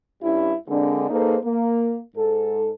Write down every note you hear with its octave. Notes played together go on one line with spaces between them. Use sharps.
G2 G3 C#4 E4
D3 G#3 A#3 C4 D4
A#3 D#4 G#4 A4 B4 C5
A#3
G#2 A4